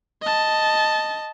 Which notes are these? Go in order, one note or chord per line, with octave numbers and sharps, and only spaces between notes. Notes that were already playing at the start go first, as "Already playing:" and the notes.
D#5 A5